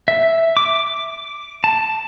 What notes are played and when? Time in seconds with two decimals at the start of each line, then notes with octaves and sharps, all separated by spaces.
0.08 E5
0.57 D6
1.64 A5